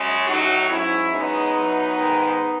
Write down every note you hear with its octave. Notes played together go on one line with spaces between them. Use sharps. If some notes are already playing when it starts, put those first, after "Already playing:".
Already playing: F#2 C#3 G#3
A2 F#3 D#4 F#4
G#2 F#3 C#4 E4
F#2 C#3 G#3 B3 D#4
E2 B2 F#3
G#2 D#3 G#3